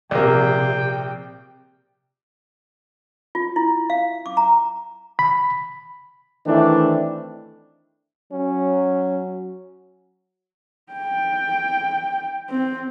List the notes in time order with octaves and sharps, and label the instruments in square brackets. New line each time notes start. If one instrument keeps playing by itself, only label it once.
[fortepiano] A#1 A#3 [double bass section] C3 [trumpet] G5
[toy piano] F4
E4
F5
D6
A#5
[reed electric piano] B5
[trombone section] D#3 E3 A3 C4 D4 E4
[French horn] F#3 [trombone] C#4
[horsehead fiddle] G5
C4